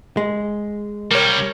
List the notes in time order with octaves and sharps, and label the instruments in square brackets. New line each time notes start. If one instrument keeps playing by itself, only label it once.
[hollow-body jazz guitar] G#3
[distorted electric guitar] C2 G3 [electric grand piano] A#4 C#5